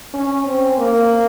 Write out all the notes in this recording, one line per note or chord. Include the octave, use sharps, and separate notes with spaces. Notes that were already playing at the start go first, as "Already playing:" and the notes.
C#4
C4
A#3